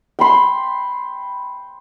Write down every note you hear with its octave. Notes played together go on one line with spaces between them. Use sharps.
G5 B5 C6